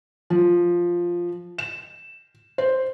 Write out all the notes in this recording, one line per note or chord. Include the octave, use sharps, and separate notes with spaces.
F3
E7
C5